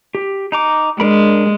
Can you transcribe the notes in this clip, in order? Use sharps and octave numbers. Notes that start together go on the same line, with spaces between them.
G4
D#4 A#5 D6
G#3 D4 A#4 B5